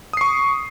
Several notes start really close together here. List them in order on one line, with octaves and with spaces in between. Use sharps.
D#6 C7 C#6